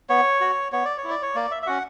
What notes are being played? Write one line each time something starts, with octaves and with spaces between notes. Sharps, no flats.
B3 C#5
F#4
B3 C#5
D5
C#5
E4
D5
C#5
A#3 D5
E5
E5
C#4 F#4 F#5